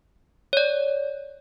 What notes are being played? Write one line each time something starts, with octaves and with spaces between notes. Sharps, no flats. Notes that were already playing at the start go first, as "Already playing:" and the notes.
C#5 D5